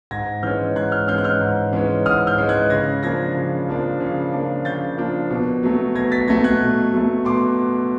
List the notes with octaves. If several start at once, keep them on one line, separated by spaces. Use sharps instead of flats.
G#2 G#6 A#6
E3 G#3 C#4 F6 G6
G#2 F#6 G#6
F6 G6
E3 G#3 C#4 F6 G6
F#6
F6 G6
G#2
E3 G#3 C#4
G#2 D#6 F6
F6 G6
E3 G#3 C#4
F#6 G#6
C#3 G#6 A#6
F3 A#3 D4 G#6 A#6
C#3
F3 A#3 D4
C#3
F3 A#3 D4
C#3 G6 A6
F3 A#3 D4
B2
F#3 A3
B2 G#6 A#6
A6 B6
F#3 A3 G#6 A#6
F#6 G#6
B2
F#3 A3
B2 C6 D6